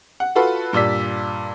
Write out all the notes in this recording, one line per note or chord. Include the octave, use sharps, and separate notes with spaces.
F#5
F4 F#4 A4 B4
G2 A#2 D5 E6 B6